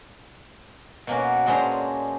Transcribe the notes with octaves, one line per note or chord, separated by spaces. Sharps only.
B2 A#3 C#4 F#4
A#2 G#3 C#4 D4 C5 A#5